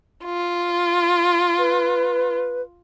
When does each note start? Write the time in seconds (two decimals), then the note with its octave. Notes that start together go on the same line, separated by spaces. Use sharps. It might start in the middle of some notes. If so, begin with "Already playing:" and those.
0.24 F4
1.58 B4